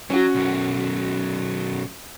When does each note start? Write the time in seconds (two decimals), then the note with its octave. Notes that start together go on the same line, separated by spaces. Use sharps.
0.10 F#3 C#4 F#4
0.35 B1 F#2